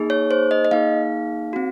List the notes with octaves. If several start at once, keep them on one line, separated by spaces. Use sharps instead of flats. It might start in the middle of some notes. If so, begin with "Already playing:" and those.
Already playing: A#3 D#4 G#4
C#5
C5
D#5
D#5
A#3 D#4 G#4 F5
C4 F#4